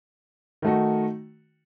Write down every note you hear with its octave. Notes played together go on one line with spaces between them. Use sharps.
D#3 A3 D#4 F#4